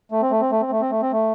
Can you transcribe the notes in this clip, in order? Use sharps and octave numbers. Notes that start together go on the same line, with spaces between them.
A3
C4
A3
C4
A3
C4
A3
C4
A3
C4
A3